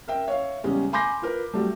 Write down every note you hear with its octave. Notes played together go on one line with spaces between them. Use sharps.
A#4 E5 G5
C#5 E5 F5
E2 C#3 G3 G#3 C#4
G#5 B5 C6 D6 G6 A#6
F4 A#4 B4
F#3 G3 A3